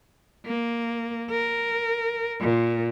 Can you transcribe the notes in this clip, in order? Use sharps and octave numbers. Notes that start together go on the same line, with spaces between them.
A#3
A#4
A#2